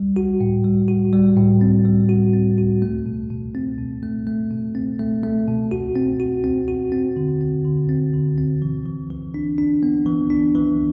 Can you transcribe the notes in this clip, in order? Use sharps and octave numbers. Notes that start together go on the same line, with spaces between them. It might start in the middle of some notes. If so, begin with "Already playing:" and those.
Already playing: G3
F#4
A2
G3
F#4
G3
A2
C4
G3
F#4
C4
F#4
A3
B2
B2
C4
B2
A3
A3
B2
C4
A3
A3
B2
F#4
C4
F#4
C4
F#4
C4
D3
C4
D3
C4
D3
C4
E3
E3
E3
D4
D4
B3
E3
D4
E3